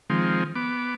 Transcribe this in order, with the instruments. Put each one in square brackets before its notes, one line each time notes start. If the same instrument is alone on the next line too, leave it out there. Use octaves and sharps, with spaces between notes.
[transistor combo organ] D#3 F3 G#3 C4
B3 D6